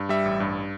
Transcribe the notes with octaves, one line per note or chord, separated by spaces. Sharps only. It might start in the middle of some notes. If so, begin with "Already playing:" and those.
Already playing: G2
G3 E5
A1
G2